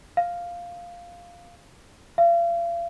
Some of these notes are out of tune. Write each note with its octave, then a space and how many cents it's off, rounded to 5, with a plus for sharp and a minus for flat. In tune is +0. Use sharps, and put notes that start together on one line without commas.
F5 +0
F5 -40